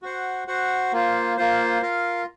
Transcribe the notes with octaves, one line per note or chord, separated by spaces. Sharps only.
F#4 C5 F#5
F#4 C5 F#5
A#3 F4 C5
A#3 F4 C5
F4 A#4 F5